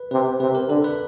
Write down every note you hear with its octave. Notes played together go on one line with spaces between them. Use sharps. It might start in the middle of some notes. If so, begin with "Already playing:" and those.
Already playing: B4
C3 B4
C3 B4
A#4
D3 A4
B4